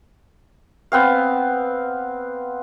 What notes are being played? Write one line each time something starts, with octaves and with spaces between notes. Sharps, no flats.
B3 C4 F5